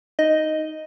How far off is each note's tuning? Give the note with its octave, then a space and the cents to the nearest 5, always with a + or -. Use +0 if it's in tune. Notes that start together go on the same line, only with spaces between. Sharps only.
D#4 +0 D#5 +0